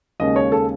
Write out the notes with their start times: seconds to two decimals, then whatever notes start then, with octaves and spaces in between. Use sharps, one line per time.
0.20 D#2 C#3 G#3 D#5
0.36 C#5
0.52 A4